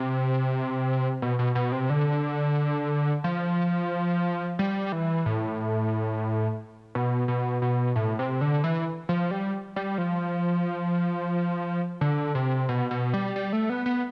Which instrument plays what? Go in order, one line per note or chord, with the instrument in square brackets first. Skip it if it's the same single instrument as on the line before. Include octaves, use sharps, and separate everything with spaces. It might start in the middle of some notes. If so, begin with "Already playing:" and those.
Already playing: [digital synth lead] C3
B2
B2
B2
C3
D3
F3
G3
E3
A2
B2
B2
B2
A2
C3
D3
E3
F3
G3
G3
F3
D3
C3
B2
B2
G3
G3
A3
B3
B3